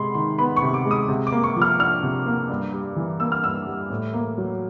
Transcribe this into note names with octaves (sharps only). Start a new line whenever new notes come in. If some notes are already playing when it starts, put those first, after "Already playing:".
Already playing: C3 G#3 B5 C6
D#3 C6
B3 B5
C#6
C3
D6
G#3
D#6
C3
D6
A#3
C#6
F3
F6
D4 F6
C3
A#3
G2
G3
E3
A#3 E6
F6
G2 E6
G3
A2
A#3
F#3